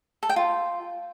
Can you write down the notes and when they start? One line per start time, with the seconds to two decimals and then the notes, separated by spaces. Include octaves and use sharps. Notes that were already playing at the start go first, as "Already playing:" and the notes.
0.23 A4
0.29 G5
0.36 F4